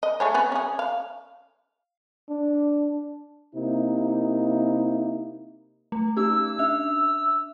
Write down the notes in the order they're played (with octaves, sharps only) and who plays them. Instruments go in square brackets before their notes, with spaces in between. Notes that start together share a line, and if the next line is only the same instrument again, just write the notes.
[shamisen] D#5
A3 G#4 C#5
B3 C#4 F#4
C#4 G#4
F5
[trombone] D4
[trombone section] C3 A#3 D#4 E4
[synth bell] A3
[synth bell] C#4 D#4 G4 [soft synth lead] E6
[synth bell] C#4 D4 E5